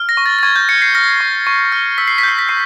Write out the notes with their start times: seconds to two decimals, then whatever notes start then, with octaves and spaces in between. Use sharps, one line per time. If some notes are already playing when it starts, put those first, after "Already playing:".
Already playing: F6
0.09 A#6
0.17 C#6
0.26 A6
0.39 A6
0.43 C#6 G#6
0.56 G6
0.69 F6 C#7
0.82 C7
0.95 F6 A#6
1.21 C#6
1.47 C#6
1.72 F6
1.98 E6 B6
2.08 C7
2.18 G6 B6
2.29 C7
2.39 B6
2.49 C#6 C7